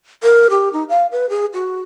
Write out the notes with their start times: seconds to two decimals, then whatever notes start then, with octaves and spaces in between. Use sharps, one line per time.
0.23 A#4
0.50 G4
0.73 D#4
0.89 F5
1.12 B4
1.30 G#4
1.54 F#4